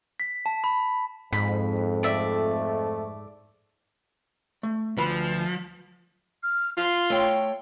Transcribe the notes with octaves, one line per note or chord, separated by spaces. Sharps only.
B6
A5
B5
F2 G#2 B5
A3 D5 E5
A3
D2 F3 B4 B5
F6
F4 C6
A3 C#5 G5